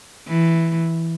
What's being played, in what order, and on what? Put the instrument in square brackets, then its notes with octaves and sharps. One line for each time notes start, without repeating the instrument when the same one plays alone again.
[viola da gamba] E3